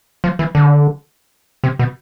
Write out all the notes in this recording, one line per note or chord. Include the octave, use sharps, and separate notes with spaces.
F3
E3
D3
C3
B2